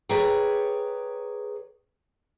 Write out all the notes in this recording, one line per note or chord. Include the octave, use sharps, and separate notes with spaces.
G#4 B4 C#5 D5 G5 A#5